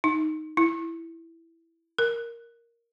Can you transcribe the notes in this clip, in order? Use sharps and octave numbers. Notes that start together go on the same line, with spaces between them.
D#4
E4
A#4